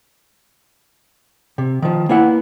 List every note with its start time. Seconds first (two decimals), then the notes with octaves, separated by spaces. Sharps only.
1.58 C3
1.82 D#3 F3
2.09 A#3 B3 E4 F#5